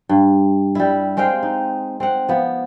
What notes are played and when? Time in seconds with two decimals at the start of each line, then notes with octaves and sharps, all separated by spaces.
0.09 G2
0.75 G3 E4
1.17 G#3 C4 F5 G5
1.43 D#4
2.00 C4 F#5
2.29 F3 B3